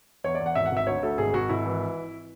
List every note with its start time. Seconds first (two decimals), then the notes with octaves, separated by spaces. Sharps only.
0.24 E2 C#5
0.35 D5
0.40 E2
0.46 F#5
0.55 G#1 E5
0.66 F#5
0.71 G#1
0.77 E5
0.87 D2 C#5
1.03 D2 A4
1.18 G#1 G#4
1.33 G#1 F#4
1.49 G#1 E4
1.66 E3